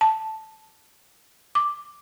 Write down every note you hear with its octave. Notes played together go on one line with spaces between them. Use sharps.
A5
D6